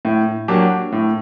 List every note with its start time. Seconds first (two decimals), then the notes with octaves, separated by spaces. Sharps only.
0.05 A2
0.48 F#3 A#3 D4 G4
0.92 A2